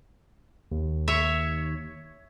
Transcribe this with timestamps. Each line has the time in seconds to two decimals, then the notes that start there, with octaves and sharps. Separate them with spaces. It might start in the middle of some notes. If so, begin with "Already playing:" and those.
0.71 D#2
1.08 C#5 E5